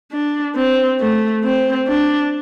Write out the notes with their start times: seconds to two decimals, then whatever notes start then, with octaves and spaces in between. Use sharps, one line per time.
0.12 D4
0.56 C4
1.00 A3
1.44 C4
1.88 D4